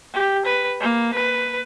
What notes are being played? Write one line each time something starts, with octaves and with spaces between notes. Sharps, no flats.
G4
B4
A#3
B4